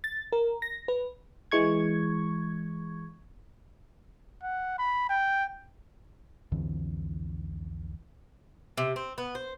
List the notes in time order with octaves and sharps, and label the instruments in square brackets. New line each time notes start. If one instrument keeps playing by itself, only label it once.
[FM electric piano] A6
A#4
A#6
B4
E3 G#3 C#6 G#6
[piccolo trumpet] F#5
B5
G5
[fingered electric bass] C2 F2 D3 E3
[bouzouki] C3
C4
B3
C5